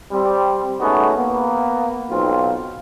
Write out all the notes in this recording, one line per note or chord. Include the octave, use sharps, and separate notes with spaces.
G3 C4
G#3 A3 B3 C#4 D#4 F#4
A#3 B3
B1 C4 F4